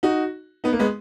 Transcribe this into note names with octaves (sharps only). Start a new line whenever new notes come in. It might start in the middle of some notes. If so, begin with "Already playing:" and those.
D#4 F#4
B3 D#4
A#3
G#3 B3